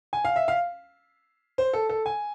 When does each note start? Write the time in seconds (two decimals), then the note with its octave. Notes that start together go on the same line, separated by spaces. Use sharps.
0.13 G#5
0.25 F5
0.36 E5
0.48 F5
1.58 C5
1.73 A4
1.89 A4
2.06 G#5